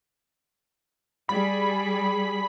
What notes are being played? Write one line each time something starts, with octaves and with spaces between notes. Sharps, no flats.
G3 G#4 B5